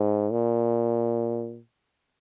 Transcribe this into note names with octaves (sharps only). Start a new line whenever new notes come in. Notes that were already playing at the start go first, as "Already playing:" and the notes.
Already playing: G#2
A#2